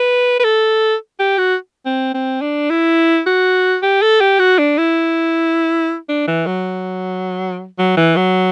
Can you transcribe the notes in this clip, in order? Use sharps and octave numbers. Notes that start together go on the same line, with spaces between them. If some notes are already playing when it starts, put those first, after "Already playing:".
Already playing: B4
B4
A4
G4
F#4
C4
C4
D4
E4
F#4
G4
A4
G4
F#4
D4
E4
D4
E3
F#3
F#3
E3
F#3